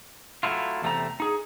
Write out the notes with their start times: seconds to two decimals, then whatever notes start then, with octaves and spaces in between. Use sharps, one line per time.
0.43 F#3 A3 E4 F4
0.82 E2 C3 A3 C4 A#5
1.20 D#4 G#4